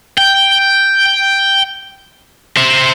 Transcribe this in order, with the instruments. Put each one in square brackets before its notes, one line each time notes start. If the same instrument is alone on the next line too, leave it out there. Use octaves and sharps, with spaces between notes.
[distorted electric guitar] G5
C5 E5